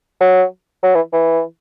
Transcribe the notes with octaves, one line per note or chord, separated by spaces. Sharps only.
F#3
F#3
E3
E3